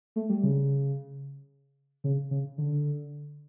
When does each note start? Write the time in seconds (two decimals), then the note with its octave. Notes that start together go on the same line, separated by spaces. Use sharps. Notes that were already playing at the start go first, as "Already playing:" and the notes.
0.16 A3
0.29 G3
0.43 C#3
2.04 C#3
2.31 C#3
2.58 D3